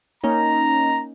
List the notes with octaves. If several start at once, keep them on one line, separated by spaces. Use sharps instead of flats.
A#3 C#4 D#4 A#5